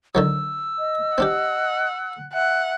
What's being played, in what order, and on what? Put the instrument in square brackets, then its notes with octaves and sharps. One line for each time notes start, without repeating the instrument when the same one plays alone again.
[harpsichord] D3 D#3 F#3 [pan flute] E6
[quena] D#5
[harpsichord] C4 D4 G4 [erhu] F#5
[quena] E5 [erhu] F#5